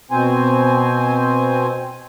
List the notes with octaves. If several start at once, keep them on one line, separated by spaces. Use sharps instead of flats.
B2 C4 C5 G#5